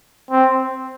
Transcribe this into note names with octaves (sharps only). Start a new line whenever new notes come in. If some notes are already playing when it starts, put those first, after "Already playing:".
C4